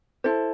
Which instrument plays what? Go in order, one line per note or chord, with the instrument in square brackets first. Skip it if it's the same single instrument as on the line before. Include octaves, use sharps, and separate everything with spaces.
[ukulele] E4 A4 C5